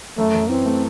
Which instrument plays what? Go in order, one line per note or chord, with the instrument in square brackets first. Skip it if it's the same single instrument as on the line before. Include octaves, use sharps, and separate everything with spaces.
[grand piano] F#2 [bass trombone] A3
[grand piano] F#2
[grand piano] E3 [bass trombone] C4
[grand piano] A3